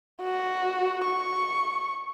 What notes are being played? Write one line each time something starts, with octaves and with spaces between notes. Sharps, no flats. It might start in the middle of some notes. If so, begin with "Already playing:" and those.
F#4
C#6